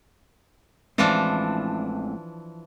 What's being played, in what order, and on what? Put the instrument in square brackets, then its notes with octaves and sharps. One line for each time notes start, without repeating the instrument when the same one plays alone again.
[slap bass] A1 G#3 C4 [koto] E3 F3 D4